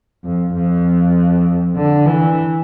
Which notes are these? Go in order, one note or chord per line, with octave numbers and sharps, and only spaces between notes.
F2
F2
D3
E3